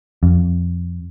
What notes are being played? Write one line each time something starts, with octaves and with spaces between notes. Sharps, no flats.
F2